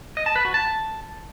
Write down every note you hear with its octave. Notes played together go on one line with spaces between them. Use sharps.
D#5
A5
B4
F#4
A5